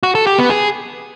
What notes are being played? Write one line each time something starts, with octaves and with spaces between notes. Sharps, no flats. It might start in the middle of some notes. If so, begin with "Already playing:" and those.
F#4
A4
G4
B3
G#4